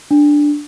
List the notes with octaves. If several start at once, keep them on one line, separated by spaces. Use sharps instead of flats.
D4